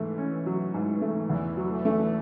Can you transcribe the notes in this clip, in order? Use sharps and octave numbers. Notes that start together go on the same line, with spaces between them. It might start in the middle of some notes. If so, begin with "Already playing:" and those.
Already playing: G#2 E3 A3
C#4
F#3
G#2
A3
E2 E3
F#3
A3
A3